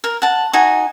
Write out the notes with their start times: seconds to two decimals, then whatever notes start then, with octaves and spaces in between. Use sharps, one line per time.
0.04 A#4
0.22 F#5 A5
0.53 D#4 F#4 G#5